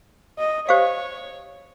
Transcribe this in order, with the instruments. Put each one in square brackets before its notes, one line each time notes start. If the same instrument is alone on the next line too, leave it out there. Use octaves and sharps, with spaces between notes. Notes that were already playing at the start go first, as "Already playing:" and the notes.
[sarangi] D#5
[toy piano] G4 C5 F5 [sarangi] C#5